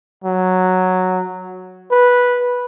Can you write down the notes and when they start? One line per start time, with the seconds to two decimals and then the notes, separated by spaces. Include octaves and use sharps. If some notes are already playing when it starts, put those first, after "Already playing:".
0.24 F#3
1.92 B4